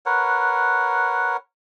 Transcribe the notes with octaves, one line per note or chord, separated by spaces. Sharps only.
A#4 B4 C#5 F#5